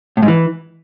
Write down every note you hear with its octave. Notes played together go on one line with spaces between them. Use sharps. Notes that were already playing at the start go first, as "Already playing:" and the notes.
A2
G#2
E3